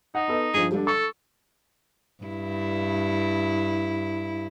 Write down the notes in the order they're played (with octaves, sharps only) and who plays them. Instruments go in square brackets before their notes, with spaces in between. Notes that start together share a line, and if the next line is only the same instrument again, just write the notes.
[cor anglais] D#4 [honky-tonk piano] F#5
[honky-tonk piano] B3 A4 D#5
[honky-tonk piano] G2 F3 [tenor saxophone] G#4
[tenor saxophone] D3 [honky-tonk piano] G3 D4
[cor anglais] A4 [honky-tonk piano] C#6
[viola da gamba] G2 E4